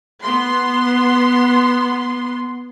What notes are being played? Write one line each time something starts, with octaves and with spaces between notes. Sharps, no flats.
B3 C6